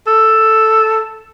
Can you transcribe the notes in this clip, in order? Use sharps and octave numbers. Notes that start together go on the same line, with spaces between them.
A4